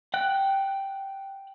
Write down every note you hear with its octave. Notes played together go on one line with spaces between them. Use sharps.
F#5 G5 F#6